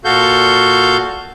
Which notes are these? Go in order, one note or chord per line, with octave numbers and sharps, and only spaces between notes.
A#2 F#4 A4 F5 G6